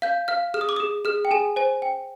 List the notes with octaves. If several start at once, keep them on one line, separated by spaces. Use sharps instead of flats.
F5 G6
F5 F6
G#4 F6
D#6
D6
G#4 D#6
G#4 F6
G5
G#4 G#5
C5 G#5
G5